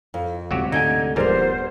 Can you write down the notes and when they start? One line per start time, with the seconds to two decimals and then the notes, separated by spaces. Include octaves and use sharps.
0.14 F2
0.51 D2 G#2 C3 F#3 F#4 G4
0.72 D3 A3 D#4 G5 G#5 G#6
1.16 D#1 G#2 F3 G3 B3 A#4 C5